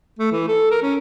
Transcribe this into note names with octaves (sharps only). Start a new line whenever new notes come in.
A3
E3
A4
A#4
C#4